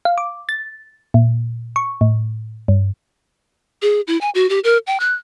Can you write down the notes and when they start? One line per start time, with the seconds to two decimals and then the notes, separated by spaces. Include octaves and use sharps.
0.05 F5
0.18 D6
0.49 A6
1.14 A#2
1.76 C#6
2.01 A2
2.68 G2
3.82 G#4
4.07 E4
4.21 G#5
4.35 F#4
4.50 G4
4.64 A#4
4.87 G5
5.00 F#6